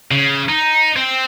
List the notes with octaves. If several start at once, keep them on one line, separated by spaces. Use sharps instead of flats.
C#3
D#4
C4